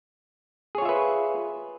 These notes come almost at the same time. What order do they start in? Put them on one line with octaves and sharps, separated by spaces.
G#4 C#5 F4 E5 B4